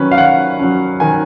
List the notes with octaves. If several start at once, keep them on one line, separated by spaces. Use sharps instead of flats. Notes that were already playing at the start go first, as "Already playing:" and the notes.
Already playing: D#3 F#3 C#4 B4
F5
D#3 F#5
F#3 C#4
D#3 G#5